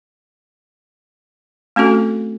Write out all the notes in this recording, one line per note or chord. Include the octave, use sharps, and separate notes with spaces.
A3 C4 C#4 F#4 A4